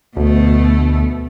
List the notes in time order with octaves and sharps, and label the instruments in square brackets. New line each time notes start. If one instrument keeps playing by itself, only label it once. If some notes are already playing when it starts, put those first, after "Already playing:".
[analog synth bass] D2 [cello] B2 A3